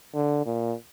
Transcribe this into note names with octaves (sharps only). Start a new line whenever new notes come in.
D3
A#2